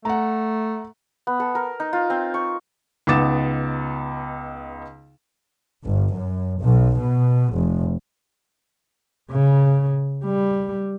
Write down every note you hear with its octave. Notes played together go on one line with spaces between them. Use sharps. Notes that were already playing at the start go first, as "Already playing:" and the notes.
A3 F#5 A#5
B3
A4
A#4
D#4
F4
C4
C#6
C#2 B3 D#4 D6 A6 E7
G1
F#2
B1
B2
F1
C#3
G3